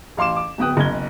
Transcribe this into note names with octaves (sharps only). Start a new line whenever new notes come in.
A1 F5 C6 D6 E7
D6
D1 B3 G5 D#6 F#6
F#1 B1 G#6 G7